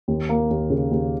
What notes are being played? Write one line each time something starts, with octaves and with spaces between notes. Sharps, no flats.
D#2
A#3
D#2
C#3
D#2